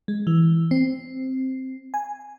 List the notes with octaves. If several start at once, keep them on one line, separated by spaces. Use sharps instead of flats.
G#3
E3
C4
G#5